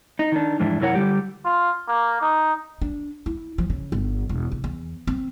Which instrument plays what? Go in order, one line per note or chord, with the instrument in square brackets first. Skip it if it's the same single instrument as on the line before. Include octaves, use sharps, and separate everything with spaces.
[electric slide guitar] D#4
D#3 D4
F2 G#2 E3 D4 E4
F#2 C3 E4 A#4 C#5 F#5
D3 G3 G4
[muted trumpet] F4
A#3
D#4
[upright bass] D4
E4
F3
C#3
G1
E1
C2
E2
C4